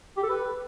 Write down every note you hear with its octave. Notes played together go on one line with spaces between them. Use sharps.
G4
A4
B4